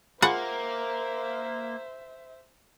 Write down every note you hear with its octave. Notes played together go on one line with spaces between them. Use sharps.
A#3 F4 G#4 C5 E5 F#5 B5